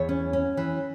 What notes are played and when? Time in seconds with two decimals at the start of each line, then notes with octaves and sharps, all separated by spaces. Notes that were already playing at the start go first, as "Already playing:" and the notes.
Already playing: E2 C#5
0.09 C#4
0.33 C#4
0.57 E3